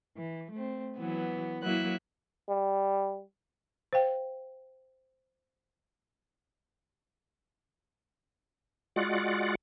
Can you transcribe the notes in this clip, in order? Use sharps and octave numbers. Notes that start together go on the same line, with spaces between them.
E3
A3 C4
E3 F#3 B3
F#3 A#3 E4 E5 F#6
G3
C5 F5 G5
G#3 F4 F#4 D5 F#5